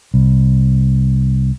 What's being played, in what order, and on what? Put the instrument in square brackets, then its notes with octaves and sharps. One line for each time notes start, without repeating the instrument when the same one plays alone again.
[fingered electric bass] C2